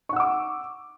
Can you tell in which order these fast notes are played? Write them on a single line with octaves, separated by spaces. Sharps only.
C#6 F#5 E6 D6